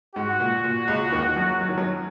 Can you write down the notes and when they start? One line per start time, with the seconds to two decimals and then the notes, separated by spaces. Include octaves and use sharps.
0.15 G#2 F#4
0.40 A#2
0.64 A#2
0.88 C#2 C#3
1.12 D#2 D#3
1.36 F#2 F#3
1.61 F#3
1.69 D#3
1.77 F#2 F#3